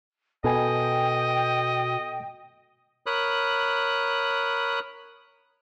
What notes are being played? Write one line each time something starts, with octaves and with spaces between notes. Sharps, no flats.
B2 A4 B4 D#5 G5 G#5
A#4 C#5 B5 D#6 F#6